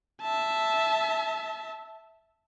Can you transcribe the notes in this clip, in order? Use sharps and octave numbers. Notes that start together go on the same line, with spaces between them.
E5 A5